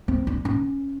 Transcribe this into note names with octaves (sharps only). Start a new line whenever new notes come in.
C4
D4
C#4